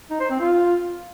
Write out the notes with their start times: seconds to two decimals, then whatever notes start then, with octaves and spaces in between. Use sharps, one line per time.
0.10 D#4
0.20 C5
0.30 C4
0.40 F4